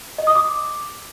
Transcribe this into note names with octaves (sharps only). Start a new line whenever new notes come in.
D#5
D#6
D6